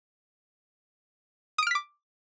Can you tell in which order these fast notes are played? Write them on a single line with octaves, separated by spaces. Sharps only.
D#6 D7 F6 B6 D6